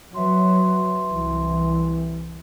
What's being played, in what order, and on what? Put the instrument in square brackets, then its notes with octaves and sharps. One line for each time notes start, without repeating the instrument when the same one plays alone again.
[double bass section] F#3 [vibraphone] B4 E5 C6
[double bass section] C2 E3